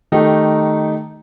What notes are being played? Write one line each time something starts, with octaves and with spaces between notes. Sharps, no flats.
D#3 A3 D#4 G4